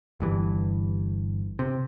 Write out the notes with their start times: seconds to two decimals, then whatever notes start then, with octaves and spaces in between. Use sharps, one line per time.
0.20 G1 G2 E3
1.59 C3